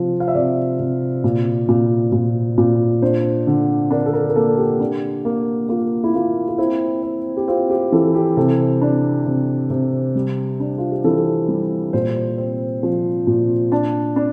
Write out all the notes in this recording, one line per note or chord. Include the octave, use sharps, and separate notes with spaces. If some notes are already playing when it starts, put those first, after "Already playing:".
Already playing: C3 F3
F5
E5
C3 D5
C3
A#2
A#2
A#2
A#2
D4 C5
D3
D4 A#4
A4
A#4
A#4
A#3 A4
G4
D4
A#3
A#3 F4
E4
A#3 F4
F4
C4 E4
C4
G4
C4 F4
G4
E3 A4
G4
C3 A4
D4
C3
C3
G3
D4
F4
G4
E3 A4
G3
A#2 C5
C4
F3
A#2
D4 A5
D4